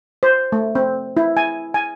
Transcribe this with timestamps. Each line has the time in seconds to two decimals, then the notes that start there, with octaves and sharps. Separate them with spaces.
0.23 C5
0.52 A3
0.75 C4
1.17 E4
1.37 G#5
1.74 G#5